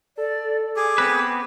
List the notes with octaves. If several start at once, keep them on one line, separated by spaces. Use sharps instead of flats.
A4 D5
G#4 D6
B3 C4 B4